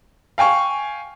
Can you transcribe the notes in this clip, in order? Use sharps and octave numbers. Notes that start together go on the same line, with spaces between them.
F5 G5 G#5 C#6